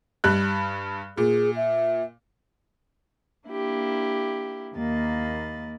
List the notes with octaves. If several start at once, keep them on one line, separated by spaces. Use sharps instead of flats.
G2 G3 F#6
A#2 G#4
E5
A#3 D4 E4 G4
D#2 A#3 D#5 B5 A6